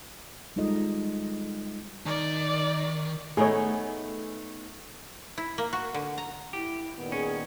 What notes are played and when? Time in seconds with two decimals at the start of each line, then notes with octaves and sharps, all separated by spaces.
0.56 G3 G#3 D#4 F4 A4 D#5
2.06 D#3 D5
3.37 A3 B3 D#4 G#4 C#5
5.38 E4
5.58 A#3
5.73 F#4
5.94 D3
6.18 A#5
6.53 E4 G4
6.95 A#2 D#3 B3
7.12 C#4 G#4